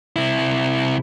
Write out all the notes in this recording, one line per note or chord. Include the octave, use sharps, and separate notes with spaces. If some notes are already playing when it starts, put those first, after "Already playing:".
C3 E4